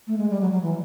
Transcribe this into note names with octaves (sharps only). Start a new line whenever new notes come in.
A3
G#3
G3
F#3
F#3
E3